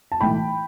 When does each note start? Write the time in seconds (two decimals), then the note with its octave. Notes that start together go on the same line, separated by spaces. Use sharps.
0.12 A5
0.21 B1 A2 E3 G5 B5